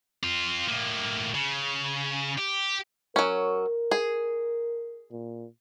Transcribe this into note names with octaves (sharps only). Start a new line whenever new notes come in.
C4 F4
A2 A#3
C#3
G4
F#3 C#4 A#4
G#4
A#2